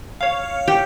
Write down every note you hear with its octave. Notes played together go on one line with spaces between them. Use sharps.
C#5 F5
G4